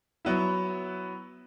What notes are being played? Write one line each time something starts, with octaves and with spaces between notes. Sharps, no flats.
F#3 B3 E4